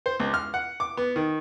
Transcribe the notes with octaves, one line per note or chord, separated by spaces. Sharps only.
C5
C#2
F6
F#5
D6
B3
D#3